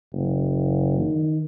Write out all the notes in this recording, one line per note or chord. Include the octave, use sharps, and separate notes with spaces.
F#1
D#3